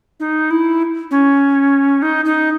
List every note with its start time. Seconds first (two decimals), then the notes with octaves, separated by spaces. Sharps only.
0.20 D#4
0.50 E4
1.11 C#4
2.02 D#4
2.25 D#4